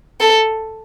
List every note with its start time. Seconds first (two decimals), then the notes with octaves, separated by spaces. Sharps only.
0.20 A4